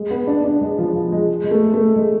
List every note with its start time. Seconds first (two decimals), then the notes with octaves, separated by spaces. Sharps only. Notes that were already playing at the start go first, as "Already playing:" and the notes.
Already playing: G#3
0.10 B3
0.27 D4
0.44 D4
0.61 G#3
0.78 F3
0.95 F3
1.12 G#3
1.44 G#3
1.51 A3
1.74 A3
1.96 G#3